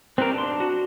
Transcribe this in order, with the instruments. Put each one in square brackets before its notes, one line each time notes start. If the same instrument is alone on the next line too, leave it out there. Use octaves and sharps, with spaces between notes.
[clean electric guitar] G2 G3 B4 [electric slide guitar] C4 A#4
[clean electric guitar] B1 G2 C6 [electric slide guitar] D4
[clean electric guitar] F#4